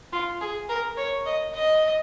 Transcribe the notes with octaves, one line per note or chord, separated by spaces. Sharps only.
F4
G#4
A#4
C#5
D#5
D#5